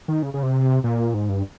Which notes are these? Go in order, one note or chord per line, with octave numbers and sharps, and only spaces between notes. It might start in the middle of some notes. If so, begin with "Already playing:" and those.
D#3
C#3
C#3
C3
A#2
G#2
G2